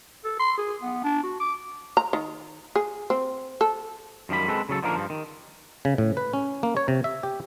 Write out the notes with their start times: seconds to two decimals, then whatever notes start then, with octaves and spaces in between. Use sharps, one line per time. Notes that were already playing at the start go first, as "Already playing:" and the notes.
0.24 A4
0.39 C6
0.57 G#4
0.82 B3
1.04 D4
1.23 F#4
1.40 D6
1.97 A#5
2.13 D#3
2.75 G#4
3.10 C4
3.61 A4
4.29 F#2 D#3 F3 G3 B5
4.48 G#3 C4 A4 B4
4.69 C#3 F#3 A4
4.83 D3 D#3 F3 A#3 D4 A#4
4.95 G2 F3
5.10 D#3
5.85 C#3
5.98 A2
6.17 B4
6.33 C#4
6.63 A#3
6.77 C#5
6.88 C3
7.04 E5
7.23 G4